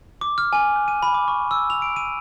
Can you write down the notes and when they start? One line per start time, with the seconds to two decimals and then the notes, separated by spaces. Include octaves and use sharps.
0.21 D6
0.38 F6
0.53 G#5
0.76 F#6
0.88 D#7
1.03 B5
1.14 D6
1.28 C#6
1.51 E6
1.70 F7
1.82 D7
1.96 D#7